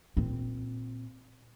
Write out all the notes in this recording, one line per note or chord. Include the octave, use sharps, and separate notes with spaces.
A#2 C4